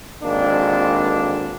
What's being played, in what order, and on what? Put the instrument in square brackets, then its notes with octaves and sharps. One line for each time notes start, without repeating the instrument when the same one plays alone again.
[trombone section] G#1 F2 D3 A#3 D4